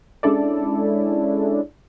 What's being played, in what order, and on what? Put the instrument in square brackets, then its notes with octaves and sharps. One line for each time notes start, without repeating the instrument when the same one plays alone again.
[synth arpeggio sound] G#3 C#4 D4 E4 A4 D5